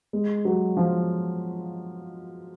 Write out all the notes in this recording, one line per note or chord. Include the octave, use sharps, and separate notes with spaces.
G#3
F#3
F3